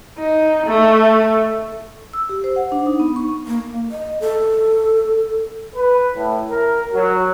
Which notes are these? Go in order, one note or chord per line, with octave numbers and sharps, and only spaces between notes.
D#4
A3
E6
G4
C5
F#5
D4
D#4
B3
C#6
A#3
D#5
A4
B4
A2
A#4
F#3